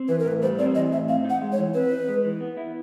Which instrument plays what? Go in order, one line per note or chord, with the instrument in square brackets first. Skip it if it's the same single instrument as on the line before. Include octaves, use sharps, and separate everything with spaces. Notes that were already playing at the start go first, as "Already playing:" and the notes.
Already playing: [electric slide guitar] C4
[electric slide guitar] E3 [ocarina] B4
[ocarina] A#4
[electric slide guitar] A2 [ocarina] B4
[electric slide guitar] G3 [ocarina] C5
[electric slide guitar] C4 [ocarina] D5
[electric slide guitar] E3 [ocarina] D#5
[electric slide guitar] A2 [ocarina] E5
[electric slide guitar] C4 [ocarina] F5
[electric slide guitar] D#4
[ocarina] F#5
[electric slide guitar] G#3
[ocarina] C#5
[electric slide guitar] E3
[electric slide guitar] C4 [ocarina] B4
[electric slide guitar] D#4
G#3
E3
B3
E4